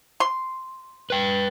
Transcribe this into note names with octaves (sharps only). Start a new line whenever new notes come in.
C6
B4 G5